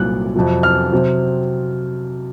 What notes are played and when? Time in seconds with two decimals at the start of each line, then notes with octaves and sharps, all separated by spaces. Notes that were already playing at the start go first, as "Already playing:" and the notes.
Already playing: C2 A#2 F#3 F#6
0.36 F2 C3 F#3
0.63 F6
0.92 C3 F#3 C4